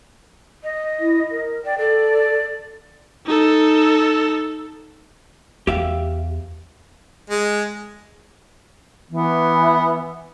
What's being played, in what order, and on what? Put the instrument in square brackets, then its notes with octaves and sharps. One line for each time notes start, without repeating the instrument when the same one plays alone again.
[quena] D#5
[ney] E4
A#4
[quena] D5 [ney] G5
[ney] A4 [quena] D5
[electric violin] D#4 A4
[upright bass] E2 [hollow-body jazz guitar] G4 E5 F5
[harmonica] G#3
[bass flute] E3 [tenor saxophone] B3